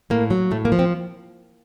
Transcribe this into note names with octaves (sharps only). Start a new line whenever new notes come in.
A2 A#3
F#3
A2 A3
A#3
F3
C4